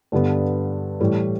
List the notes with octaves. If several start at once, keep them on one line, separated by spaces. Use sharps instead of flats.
G2 D3 G3 B3
A2 E3 G3